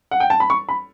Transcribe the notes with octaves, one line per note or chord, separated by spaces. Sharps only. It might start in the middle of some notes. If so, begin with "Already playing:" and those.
F#5
G5
A5
B5
C#6
B5